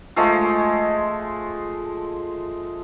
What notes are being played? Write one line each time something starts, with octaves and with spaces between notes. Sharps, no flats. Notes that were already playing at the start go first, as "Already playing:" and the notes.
F3 G#3 A3